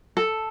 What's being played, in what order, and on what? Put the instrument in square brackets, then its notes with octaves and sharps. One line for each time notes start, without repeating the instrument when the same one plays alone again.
[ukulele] A4